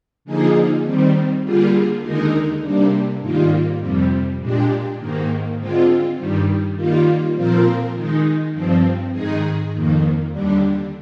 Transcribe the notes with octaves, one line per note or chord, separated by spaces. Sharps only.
D3 F3 A#3 D#4 G#4
D#3 G3 C4
D3 G3 A#3 F4 G#4
D#2 D3 G#3 D#4 A#4
C3 G3 A#3 D4
G#2 D#3 G3 A#3 F4
F2 C3 G3
A#2 G#3 D4 G4
G#2 D#3 A#3
D3 G#3 C4 F4
G2 D#3 G3
D#3 G3 A#3 F4
A#2 F3 C4 F4 A#4
D#3 G#3 D#4
G2 F3 C4
G#2 D#3 G#3 D#4 G#4
F2 D#3 A#3
D#2 D3 G3 D4